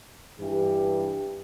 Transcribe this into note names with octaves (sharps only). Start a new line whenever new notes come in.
G2 E3 G4